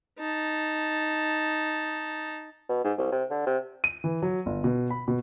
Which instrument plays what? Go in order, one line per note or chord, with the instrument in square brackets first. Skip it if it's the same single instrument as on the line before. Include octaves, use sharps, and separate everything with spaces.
[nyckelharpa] D#4 A5
[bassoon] B2
G#2
C2
C3
D3
C3
[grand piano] D#7
E3
F#3
G1
B2
B5
B2